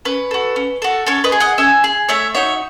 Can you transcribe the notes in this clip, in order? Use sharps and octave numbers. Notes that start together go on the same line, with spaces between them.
C#4 B4
F#4 A4
C#4
F#4 A4
C#4 A4 C#5
B4 D#5
G#4
D#5 F#5
C#4 E5 G#5
G#4
A3 C#5 E5
D#4 F#4 C#5 E5